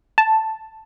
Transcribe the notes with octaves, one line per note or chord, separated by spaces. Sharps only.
A5